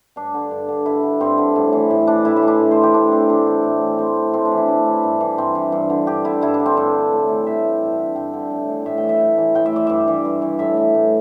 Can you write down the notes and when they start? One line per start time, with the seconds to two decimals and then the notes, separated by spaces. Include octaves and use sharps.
0.16 G2 D4
0.34 D3
0.51 G2
0.68 D3
0.86 G2 E4
1.03 D3
1.20 G2 C4
1.38 D3
1.56 A2
1.73 E3
1.90 A2
2.07 E3 D4
2.25 A2 E4
2.36 E4
2.42 E3
2.48 D4
2.59 A2
2.71 C5
2.78 E3
2.83 G4
2.94 A2 D4
3.12 E3 C4
3.29 A2 D4
3.47 E3
3.64 A2
3.81 E3
3.98 A2 C4
4.16 E3
4.33 A2 C4
4.45 D4
4.52 E3
4.57 E4
4.68 A2 D4
4.86 E3
5.03 G2
5.21 E3
5.38 G2 C4
5.55 E3
5.72 G2
5.90 D3
6.07 G2 G4
6.25 D3 E4
6.42 G2 E4
6.54 D4
6.59 D3
6.66 C4
6.77 G2 D4
6.95 D3
7.12 A2
7.29 E3
7.47 A2 E5
7.64 E3
7.82 G2
7.98 D3
8.16 G2 G5
8.33 D3
8.51 A2
8.69 E3
8.86 A2 E5
8.98 G5
9.03 E3
9.09 E5
9.20 A2
9.38 E3
9.55 A2 G5
9.66 E5
9.73 E3 D5
9.87 G2 E5
10.08 E3
10.25 G2
10.42 E3
10.59 A2 E5
10.77 E3
10.94 A2